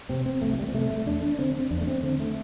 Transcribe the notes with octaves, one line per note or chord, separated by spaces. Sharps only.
C3 C4
C4
C2 A3
E3
G3
C4
C3 A3
A3
E2 D4
D4
D3 C4
C4
E2 D4
A3
C4
D3 C4
A3